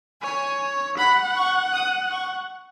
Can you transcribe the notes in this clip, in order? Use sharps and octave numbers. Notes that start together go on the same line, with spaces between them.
C#5 G#5
F#5 B5
C#6
D#6
C#6